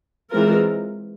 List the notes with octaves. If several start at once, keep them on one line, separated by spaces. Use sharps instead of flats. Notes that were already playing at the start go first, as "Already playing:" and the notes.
E3 G#3 C4 F4 A#4